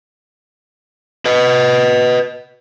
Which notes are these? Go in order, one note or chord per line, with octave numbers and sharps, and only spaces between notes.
B4 D#5